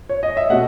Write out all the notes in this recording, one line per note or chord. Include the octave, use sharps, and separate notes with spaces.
C#5
D#5
E5
B2 A3 F#5